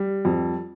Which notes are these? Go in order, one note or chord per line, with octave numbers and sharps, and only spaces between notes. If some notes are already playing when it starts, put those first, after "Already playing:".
Already playing: G3
F2